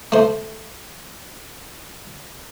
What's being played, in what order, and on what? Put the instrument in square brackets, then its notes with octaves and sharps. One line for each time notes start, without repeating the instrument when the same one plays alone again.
[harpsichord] A3 C5